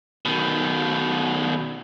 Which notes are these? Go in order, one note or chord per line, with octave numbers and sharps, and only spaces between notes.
B2 D#3